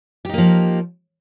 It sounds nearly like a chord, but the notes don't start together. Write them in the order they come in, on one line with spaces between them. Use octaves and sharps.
G4 D#4 A#3 F3